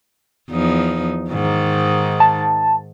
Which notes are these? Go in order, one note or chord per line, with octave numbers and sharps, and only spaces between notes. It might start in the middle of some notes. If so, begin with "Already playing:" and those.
E2 F3 D#4
G#2 D#3
A5